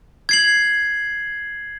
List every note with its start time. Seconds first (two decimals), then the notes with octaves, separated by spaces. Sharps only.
0.29 G#6 C7 F#7